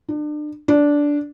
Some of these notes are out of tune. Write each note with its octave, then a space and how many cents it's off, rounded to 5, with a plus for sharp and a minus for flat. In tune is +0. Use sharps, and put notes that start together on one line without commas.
D4 +35
D4 -10